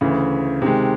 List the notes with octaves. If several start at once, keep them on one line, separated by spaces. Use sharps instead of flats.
D2 C#3 E3
C3 D#3 G#3